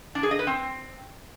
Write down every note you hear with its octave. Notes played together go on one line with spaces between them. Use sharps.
D4
G#4
D#5
B4
C4